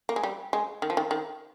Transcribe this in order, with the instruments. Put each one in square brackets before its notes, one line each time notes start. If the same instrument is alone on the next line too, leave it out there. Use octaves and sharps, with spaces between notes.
[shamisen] A#3
G#3
G3
G#3
D#3
F3
D#3
D#3